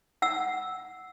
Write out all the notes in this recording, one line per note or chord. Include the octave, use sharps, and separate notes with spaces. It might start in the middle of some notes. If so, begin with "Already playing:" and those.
F#5 E6